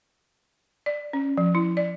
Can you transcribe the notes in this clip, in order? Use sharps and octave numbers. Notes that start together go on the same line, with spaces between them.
D5
C#4
F3
E4
D5